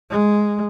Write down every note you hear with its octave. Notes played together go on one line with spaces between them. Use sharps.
G#3